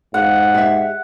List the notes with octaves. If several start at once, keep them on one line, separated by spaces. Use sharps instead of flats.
G#2 F#5
G4 E5